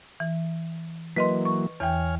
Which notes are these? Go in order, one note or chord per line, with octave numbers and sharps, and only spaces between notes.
E3
E3 F#3 A#3 B4 D#5 C6
C#6
E2 E3 C#5 G5 G#5 F6